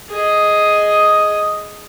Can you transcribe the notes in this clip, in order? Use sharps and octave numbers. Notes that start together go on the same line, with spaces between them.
G#4 D#5